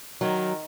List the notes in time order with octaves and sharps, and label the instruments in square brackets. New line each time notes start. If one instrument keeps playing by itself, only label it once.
[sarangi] D#3 [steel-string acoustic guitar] F#3